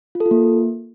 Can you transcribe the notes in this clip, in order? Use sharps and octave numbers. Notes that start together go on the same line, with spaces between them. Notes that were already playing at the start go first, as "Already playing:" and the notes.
F4
A4
F4
A#3